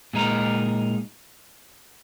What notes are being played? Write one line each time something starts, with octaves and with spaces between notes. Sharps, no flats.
A#2 G#3 D#4 A#4